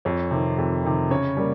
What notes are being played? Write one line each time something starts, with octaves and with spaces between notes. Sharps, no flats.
F2 C#5
C3 D#3
F2
C3 D#3
C#3 C#5
G3 A#3